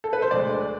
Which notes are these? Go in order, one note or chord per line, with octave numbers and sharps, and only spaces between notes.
A4
B4
C5
D2 D3 G#3 D5